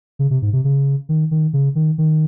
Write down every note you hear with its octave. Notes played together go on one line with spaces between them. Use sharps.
C#3
C3
G#2
C3
C#3
D#3
D#3
C#3
D#3
D#3